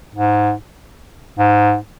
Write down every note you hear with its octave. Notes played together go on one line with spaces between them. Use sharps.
G#2
G#2